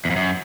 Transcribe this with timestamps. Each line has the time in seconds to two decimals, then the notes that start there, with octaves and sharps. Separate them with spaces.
0.05 E2
0.11 F2
0.16 F#2